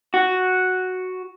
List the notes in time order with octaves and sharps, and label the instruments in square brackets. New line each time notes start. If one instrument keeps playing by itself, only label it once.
[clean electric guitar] F#4